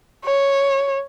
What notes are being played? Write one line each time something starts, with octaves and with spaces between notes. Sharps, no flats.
C#5